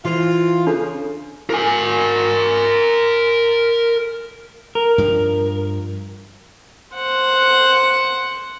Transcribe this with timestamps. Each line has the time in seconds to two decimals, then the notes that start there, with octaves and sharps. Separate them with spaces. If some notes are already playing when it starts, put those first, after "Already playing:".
0.05 E3 F4 C5
0.67 C#3 D4 A4
1.50 A#4 G#5
4.75 A#4
4.98 G2 F3
6.95 C5 F#5